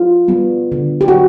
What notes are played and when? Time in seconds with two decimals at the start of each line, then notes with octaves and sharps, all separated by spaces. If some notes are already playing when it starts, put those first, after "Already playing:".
Already playing: F4
0.28 G3 B3
0.72 D3
1.01 G4
1.08 F#4